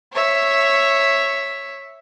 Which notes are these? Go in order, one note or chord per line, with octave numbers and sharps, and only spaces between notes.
C#5 E5